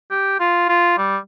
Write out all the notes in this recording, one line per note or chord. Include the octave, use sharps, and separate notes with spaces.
G4
F4
F4
G3